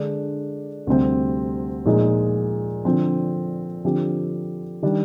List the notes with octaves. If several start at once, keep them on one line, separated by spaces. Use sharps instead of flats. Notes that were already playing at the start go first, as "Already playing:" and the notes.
Already playing: D3 G#3 D4
D2 C3 G3 C4
A#2 F3 G#3 D#4
D3 F3 C4
D3 F3 C4 G4
D#3 G3 D4